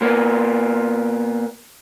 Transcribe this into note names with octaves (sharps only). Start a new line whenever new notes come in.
A#2 A#3 B3